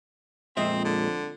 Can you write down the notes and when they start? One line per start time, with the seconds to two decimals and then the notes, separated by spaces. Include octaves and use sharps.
0.57 F2 A#2 G#3 C4 E5
0.85 D3